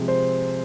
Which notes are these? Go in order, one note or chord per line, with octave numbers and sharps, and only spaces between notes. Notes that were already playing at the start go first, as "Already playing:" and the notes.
Already playing: C3 F3 G#3
C5